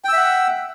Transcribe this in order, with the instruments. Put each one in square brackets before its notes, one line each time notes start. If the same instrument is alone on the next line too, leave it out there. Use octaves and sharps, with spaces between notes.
[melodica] G5
E6
E5
F#5